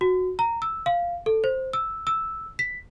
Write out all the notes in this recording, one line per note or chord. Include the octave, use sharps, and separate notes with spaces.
F#4
A#5
E6
F5
A4
C5
E6
E6
B6